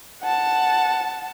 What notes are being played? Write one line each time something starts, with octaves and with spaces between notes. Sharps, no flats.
F#5 A5